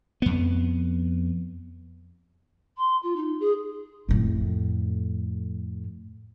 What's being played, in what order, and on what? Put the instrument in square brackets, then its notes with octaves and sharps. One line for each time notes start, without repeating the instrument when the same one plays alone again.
[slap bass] F2 B3
[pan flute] C6
F4
D#4
G#4
[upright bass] F2 A2